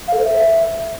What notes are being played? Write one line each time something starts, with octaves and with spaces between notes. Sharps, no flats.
F5
A4
C5
E5